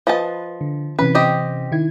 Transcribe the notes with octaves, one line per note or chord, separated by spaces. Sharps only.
F3 B4 D#5 A5
D3
C3 E3 C#4 B4
C4 G4 D#5
D#3 E4 G#6